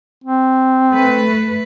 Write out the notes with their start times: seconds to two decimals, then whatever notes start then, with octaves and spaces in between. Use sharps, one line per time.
0.24 C4
0.91 A3 B4